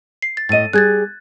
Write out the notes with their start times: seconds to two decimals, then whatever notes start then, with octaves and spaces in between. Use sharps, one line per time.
0.22 C7
0.37 A6
0.49 A2 D#5 A6 D#7
0.73 G3 G#4 F#6 G#6 A6